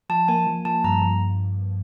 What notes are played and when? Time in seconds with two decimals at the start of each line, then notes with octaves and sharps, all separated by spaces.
0.10 F3 A5
0.28 A#3 G#5
0.47 F3
0.65 F3 A5
0.84 G2 A#5
1.02 F3